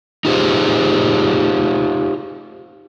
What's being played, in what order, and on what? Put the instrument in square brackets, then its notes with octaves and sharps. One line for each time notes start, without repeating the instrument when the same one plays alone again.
[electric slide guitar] D#4 F4 G4 G#4 C5